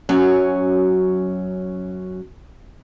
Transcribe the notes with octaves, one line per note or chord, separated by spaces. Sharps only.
F#2 F#3 C#4